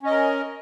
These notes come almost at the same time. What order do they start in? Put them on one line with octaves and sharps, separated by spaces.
C#4 D#5 A#4